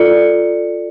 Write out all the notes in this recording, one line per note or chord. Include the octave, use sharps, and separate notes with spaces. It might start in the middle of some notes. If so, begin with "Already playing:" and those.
Already playing: F4 A4 D5 C#7